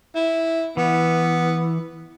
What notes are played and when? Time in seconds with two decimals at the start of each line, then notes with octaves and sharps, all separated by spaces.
0.15 E4
0.77 E3 B3